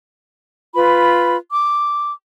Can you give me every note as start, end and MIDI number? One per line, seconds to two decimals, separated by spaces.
0.75 1.37 65
0.75 1.37 71
0.75 1.37 83
1.51 2.11 86